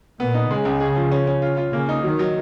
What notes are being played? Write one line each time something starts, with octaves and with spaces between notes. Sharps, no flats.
A#2 B3
D#4
C#3 G#3
C#2
G#4
F3
C#4
C#4
F4
F4
C#3 A#3
D#4
D#3 F#3
F#3